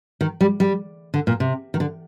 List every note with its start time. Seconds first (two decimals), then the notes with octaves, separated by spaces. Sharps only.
0.21 D#3
0.41 G3
0.60 G3
1.14 D3
1.27 A#2
1.40 C3
1.74 D#3
1.80 D3